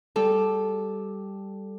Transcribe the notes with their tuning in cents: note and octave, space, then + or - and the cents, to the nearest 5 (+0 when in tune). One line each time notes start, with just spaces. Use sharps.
G3 +0 A4 -10